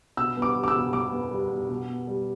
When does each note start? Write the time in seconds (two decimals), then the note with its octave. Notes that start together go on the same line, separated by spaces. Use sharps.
0.17 B2 E6
0.37 B3
0.42 D6
0.56 G3
0.64 D6
0.68 E6
0.75 B2
0.93 B2 D6
1.13 B3
1.31 G3
1.51 B2
1.69 B2
1.89 B3
2.07 G3